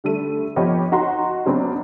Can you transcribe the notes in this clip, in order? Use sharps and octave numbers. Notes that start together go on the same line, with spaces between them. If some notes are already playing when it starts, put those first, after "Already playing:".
D3 G3 A3 A4 D#7
F3 B3 G4 C#5 D#5
D#4 F#4 F#5 A#5 C6
C#3 F#3 B3 C4 D4